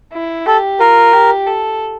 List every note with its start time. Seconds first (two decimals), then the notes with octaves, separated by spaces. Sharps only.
0.14 E4
0.46 G4 A4
0.80 F4 A#4
1.13 G4
1.47 A4